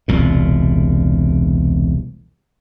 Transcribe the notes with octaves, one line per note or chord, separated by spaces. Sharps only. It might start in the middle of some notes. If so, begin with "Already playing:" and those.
E1 C2 A#2